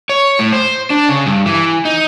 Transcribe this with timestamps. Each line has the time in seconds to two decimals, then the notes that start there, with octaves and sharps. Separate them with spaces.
0.09 C#5
0.39 A2
0.53 C5
0.90 D4
1.09 C#3
1.26 G2
1.46 E3
1.85 D#4